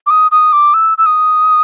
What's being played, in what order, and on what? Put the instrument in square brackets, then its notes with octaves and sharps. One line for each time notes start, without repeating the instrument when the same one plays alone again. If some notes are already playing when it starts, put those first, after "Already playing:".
[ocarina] D6
D#6
D#6
D6
E6
E6
D#6